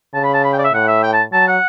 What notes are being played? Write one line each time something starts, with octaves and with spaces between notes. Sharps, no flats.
C#3 A5
B5
A5
B5
G5
D5
E5
A2 F#5
E5
G5
A5
F#3 A5
F#5